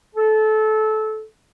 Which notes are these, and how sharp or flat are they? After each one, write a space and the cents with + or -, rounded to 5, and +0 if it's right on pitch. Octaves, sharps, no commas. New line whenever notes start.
A4 -20